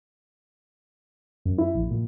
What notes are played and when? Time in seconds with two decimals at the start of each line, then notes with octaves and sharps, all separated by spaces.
1.45 F#2
1.58 E4
1.74 A#1
1.91 A#2